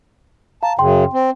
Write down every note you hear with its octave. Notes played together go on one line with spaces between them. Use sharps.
F5 A5 A#5
F#2 C#3 G5 C6
C4